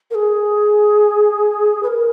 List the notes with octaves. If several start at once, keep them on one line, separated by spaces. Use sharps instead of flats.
A#4
G#4
B4
A#4